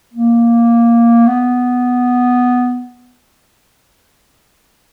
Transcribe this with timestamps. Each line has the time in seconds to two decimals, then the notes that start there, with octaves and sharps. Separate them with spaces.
0.14 A#3
1.27 B3